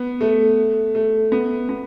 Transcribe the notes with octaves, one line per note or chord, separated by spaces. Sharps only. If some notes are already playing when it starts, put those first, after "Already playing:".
Already playing: B3
A3
A3
B3
B3